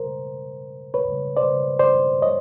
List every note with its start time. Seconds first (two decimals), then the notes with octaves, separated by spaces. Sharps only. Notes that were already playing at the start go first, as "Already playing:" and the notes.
Already playing: A#4 C5
0.94 B4 C#5
1.37 C5 D5
1.79 C5 D5
2.22 C#5 D#5